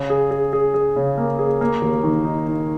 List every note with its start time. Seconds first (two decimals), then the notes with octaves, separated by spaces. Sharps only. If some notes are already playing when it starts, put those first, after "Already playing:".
Already playing: C#3
0.10 G#4
0.31 G#4
0.53 G#4
0.74 G#4
0.96 C#3
1.18 A#3
1.39 G#4
1.61 A#3
1.82 D#2
2.04 D#3
2.25 D#4
2.47 D#4